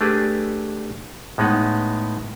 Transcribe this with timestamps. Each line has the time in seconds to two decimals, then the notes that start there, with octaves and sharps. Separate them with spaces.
0.01 A3 D4 G4 G#4 B4
1.38 A2 G#3 B3 D#4 B4 F#5